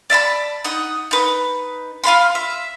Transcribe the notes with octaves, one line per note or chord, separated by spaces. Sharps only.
D5 E5 A5 B5
D#4 F#5 D#6
D#4 B4
F4 F5 B5 C6
E5